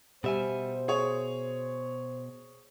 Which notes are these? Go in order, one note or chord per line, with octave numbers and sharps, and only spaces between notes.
B2 G3 C5 E5 G#5
G#4 C#5